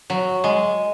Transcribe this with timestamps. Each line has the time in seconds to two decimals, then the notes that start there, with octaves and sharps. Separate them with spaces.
0.10 F#3
0.44 G#3